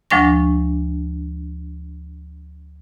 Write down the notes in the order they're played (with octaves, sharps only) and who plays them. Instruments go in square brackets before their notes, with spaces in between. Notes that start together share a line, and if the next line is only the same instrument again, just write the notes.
[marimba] D2 F3 G#3 D4 C#6 A#6